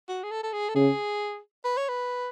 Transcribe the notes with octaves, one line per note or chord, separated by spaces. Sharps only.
F#4
G#4
A4
A4
G#4
A4
C#3 G#4
B4
C#5
B4